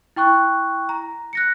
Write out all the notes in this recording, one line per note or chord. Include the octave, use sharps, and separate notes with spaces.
E4 G5 C#6 F#6
A#5
F#6 A#6 C#7